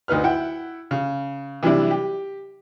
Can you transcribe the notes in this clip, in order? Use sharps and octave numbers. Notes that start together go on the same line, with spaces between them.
D2 D#4 B4 F6
E4 F#5 G5
C#3
C3 E3 F#3 G3 D4 E4
G4